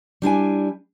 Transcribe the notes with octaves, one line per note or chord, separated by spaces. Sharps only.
G3 D4 E4 G#5